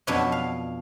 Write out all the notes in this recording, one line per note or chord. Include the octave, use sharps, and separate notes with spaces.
F2 B2 F#3 D4 C#5 E5
F5